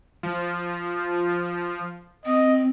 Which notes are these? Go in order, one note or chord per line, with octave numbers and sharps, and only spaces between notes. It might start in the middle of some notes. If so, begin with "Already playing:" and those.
F3
C4 D#5